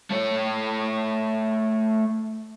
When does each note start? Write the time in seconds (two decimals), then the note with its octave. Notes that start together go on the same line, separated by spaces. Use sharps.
0.10 A3 C#5